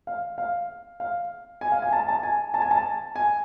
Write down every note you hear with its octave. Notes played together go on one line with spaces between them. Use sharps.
F5
F5
F5
G#5
F5
G#5
A5
A5
G#5
A5
G#5
A5
G#5